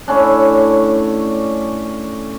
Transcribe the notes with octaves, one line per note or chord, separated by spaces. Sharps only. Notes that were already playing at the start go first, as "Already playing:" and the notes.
A2 C#4 D4